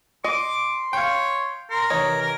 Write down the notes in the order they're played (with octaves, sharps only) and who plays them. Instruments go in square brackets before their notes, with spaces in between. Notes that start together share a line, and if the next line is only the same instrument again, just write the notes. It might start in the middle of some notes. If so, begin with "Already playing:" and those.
[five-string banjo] D#5 [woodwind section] C6 [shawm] D6
[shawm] C#5 [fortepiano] F5 G5
[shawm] A#4 [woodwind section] A#5 C6
[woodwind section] C3 D#3 E3 [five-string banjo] D#4 [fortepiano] C#5
[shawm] A#4